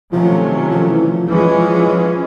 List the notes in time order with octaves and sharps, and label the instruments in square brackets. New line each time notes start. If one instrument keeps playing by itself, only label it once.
[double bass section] C3 D#3 F#3 A3 C#4 [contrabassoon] F3
[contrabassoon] F3
E3
F3
[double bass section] E3 G#3 C#4 [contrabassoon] F3
[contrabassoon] F3
F3
F3